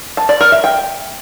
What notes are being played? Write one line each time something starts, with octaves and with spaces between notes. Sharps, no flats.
A5
D5
A#4
E5
G5